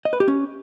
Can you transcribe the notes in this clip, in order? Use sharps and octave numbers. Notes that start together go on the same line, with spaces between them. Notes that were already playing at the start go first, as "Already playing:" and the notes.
D#5
B4
G4
C#4